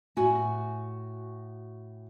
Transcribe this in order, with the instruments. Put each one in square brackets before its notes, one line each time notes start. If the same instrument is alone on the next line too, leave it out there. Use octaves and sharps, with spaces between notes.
[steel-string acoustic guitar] A2 F#4 G#5